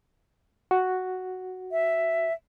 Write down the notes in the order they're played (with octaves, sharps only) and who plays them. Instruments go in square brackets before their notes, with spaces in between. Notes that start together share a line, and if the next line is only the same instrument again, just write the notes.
[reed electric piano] F#4
[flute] E5